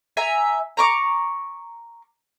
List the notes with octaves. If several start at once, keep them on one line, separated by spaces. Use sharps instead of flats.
E5 G#5 A#5
A#5 C#6 D6